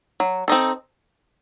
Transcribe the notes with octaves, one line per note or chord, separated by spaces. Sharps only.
F#3
C4 D#4 A4